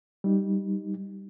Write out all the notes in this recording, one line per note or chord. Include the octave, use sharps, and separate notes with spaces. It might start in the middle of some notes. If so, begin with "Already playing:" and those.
G3 D#4